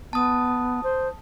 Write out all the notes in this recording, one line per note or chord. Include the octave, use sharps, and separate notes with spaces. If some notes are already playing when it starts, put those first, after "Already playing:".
B3 A5 D#6
C5